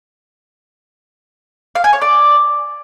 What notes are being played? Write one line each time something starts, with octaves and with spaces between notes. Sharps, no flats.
F5
G#5
C#5
D5